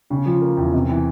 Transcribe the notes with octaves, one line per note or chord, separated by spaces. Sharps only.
C#3
F3
A#3
E2
C3
E3